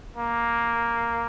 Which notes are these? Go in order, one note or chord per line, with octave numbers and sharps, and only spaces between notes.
A#3